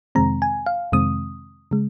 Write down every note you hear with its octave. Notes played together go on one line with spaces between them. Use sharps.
F2 C3 D#3 G#3 C4 A#5
G#5
F5
F2 C3 D#3 G#3 C4 D#6
C#3 G#3